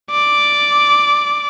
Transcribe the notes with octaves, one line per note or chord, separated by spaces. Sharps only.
D5